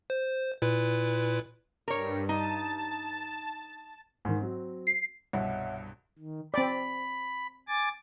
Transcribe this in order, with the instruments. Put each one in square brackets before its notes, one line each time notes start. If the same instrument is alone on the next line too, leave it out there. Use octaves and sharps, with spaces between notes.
[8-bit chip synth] C5
A#2 E4 B4
[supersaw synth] G2 [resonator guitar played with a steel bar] A#4 C#5
[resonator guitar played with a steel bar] D#4 [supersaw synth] A5
[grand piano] G#2 D#3
F#3 C4
[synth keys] C7
[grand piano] C2 G2 B2 [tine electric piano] C#5 E5 F#5
[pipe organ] D#3
[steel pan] C4 D5 [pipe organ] B5
[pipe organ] G#5 D6 A6